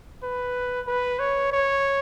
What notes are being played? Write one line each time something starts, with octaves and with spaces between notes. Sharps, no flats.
B4
B4
C#5
C#5